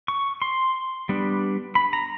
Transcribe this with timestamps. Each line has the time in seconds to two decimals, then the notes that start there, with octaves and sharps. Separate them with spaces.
0.08 C#6
0.42 C6
1.09 G3 B3 D4
1.75 B5
1.93 A#5